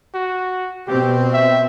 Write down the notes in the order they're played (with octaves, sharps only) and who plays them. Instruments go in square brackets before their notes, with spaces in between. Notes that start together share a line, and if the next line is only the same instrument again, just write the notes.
[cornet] F#4
[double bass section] B2 C4 [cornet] G4
[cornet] E5